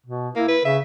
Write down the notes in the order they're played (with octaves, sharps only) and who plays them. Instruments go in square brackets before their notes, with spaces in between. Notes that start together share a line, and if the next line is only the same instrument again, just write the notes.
[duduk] B2
[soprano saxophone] A#3 [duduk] E4
[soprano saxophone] B4
[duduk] C#3 [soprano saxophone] E5